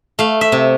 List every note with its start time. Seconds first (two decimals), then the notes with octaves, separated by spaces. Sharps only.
0.19 A3 F5
0.41 E5
0.52 C3